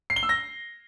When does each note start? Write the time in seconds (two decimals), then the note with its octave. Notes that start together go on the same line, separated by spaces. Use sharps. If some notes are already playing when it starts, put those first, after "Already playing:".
0.10 C7
0.16 G7
0.23 E6
0.29 A#6